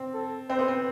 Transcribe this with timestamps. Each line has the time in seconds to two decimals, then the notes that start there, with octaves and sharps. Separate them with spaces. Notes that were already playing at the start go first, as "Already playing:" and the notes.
Already playing: C4
0.14 A4
0.49 C4 C5
0.59 B3
0.68 C4